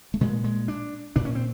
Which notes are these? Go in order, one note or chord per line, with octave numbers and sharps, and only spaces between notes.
A3
A#2 G#3
G#3
D4
A#2 D4
C#4
C4